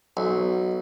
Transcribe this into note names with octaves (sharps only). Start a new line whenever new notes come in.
B1